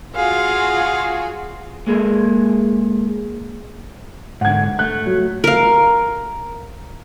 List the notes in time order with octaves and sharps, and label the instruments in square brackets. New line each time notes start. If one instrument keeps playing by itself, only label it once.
[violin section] F4 F#4 G#4 [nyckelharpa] F5
[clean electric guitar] G#3 A#3 G#4 A4
[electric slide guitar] G#2 D3 [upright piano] F#5 G#6
[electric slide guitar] A3 [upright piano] F#6
[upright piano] F#3
[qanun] A#4 F5